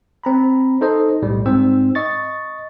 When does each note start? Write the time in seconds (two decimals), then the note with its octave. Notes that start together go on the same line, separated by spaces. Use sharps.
0.24 C4 A#5 B5
0.81 D#4 A4 C5 D#5
1.22 B1 A2 G3
1.46 G#2 C4 C5 E6
1.95 D#5 C#6 A6